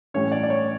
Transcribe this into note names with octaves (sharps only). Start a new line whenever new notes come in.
A2 E3 G3 C#4 C#5
D5
D5
C#5